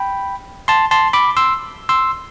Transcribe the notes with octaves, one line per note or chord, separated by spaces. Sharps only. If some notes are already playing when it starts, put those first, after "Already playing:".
Already playing: G5 B5
A5 C6
A5 C6
B5 D6
C6 E6
C6 E6